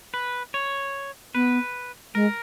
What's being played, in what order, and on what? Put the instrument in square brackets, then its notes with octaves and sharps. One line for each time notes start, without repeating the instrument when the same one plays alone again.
[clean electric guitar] B4
C#5
[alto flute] B3 [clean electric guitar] B4
[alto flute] G#3 [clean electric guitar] A#4